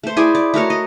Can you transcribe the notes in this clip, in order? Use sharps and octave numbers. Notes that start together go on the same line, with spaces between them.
A3 C5
E4 G#4 D5 G#5
D5
A3 F#4 A#4 C#5
D#5